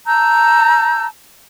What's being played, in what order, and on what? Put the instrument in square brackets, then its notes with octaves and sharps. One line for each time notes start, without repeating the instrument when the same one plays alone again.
[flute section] A5 A#5 E6 G6